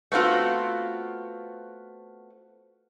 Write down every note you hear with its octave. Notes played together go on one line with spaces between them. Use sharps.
A3 B3 C4 F4 F#4